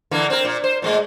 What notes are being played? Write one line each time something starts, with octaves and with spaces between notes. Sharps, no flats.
D3 E3 A#3
C4 A#4
A#2
C5
A#2 G#3 A3